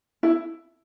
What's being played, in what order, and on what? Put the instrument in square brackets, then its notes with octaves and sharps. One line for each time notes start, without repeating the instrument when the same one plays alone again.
[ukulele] E4